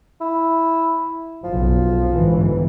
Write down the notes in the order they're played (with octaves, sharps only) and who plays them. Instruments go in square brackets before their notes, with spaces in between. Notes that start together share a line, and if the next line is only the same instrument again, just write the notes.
[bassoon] E4
[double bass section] F#1 B1 [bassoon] F3
[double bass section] G1 G#2 E3